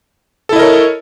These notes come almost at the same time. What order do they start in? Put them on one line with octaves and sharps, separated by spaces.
A4 E4 D#5 A#4 C#5